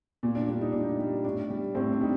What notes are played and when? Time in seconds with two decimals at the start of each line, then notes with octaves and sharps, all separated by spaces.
0.23 A#2
0.35 D4
0.48 G3 D4
0.61 D#4
0.72 A#2 D4
0.83 D#4
0.99 G3
1.24 A2 D4
1.50 G3
1.75 A2 C4
1.92 D4
2.01 G3 D#4